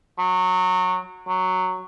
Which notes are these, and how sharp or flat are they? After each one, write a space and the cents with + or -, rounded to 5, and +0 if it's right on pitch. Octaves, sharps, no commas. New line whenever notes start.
F#3 -15
F#3 +0